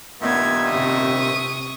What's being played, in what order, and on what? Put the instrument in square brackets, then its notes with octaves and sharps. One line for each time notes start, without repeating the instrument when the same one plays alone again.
[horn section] G2 A#2 D#3 [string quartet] B3 G#6 [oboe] E5
[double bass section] C3 [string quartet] C#6 D#6